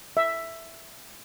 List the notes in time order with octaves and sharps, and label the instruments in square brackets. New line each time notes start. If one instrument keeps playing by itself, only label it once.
[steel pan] E5